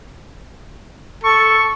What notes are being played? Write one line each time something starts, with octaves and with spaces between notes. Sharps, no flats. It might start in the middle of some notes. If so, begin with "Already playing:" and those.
A4 C#6